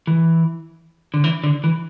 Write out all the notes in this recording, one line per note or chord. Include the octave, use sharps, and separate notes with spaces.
E3
D3
E3
D3
E3